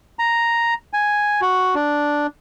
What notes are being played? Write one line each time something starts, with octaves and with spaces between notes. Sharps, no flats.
A#5
G#5
F#4
D4